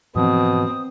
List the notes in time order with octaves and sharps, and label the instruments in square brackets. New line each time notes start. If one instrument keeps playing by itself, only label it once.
[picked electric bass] G#2 E3 F3 [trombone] B2 [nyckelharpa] C4 [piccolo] D#6